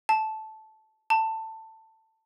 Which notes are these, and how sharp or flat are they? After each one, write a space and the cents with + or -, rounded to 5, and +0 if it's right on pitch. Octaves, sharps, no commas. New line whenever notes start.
A5 -10
A5 +15